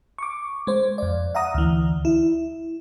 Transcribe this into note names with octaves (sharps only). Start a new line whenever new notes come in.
C#6 D6
G#3 C5
F2 D5
E5 F#5 A#5 D#6
D2 E3
E4